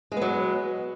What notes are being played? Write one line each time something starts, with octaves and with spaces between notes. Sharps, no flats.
F#3 G#3 B3